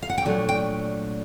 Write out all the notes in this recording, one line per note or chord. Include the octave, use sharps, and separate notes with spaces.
F5
F#5
G5
A#2 F#3 A3 D4 G#5
G5